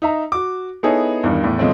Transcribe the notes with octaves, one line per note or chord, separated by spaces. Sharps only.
D#4 E5 A#5
F#4 D6
B3 D#4 E4 G#4 A4 C#5
E2 G2 D#3
E2 A2
B2 F3 G#3 A3 C4 C#4